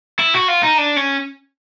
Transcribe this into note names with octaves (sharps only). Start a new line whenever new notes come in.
E4
F#4
F4
D#4
D4
C#4